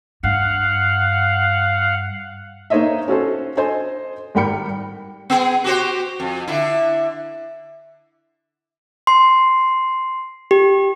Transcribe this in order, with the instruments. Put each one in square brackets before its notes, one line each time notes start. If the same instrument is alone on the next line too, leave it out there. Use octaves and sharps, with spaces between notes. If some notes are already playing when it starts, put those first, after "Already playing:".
[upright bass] G2 [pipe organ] F5 F#5
[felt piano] A#3 D#4 C5 C#5 D#5 E5
C#4 F#4 A4 C5
A4 C5 D#5 G#5
G#1 G3 A#4 G5 B5 C#7
[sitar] B3 G#4
F#4 G4 C5
F2
D3 E4
[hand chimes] C6
G4